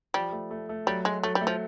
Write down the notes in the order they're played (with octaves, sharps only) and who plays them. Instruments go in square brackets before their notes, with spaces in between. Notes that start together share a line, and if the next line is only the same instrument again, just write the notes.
[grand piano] F3 [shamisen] G3
[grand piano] A3
A3
A3
[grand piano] F#3 [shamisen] G3
[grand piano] F#3 [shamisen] G#3
[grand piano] F#3 [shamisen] A3
[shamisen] G3
[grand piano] A3
[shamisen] F3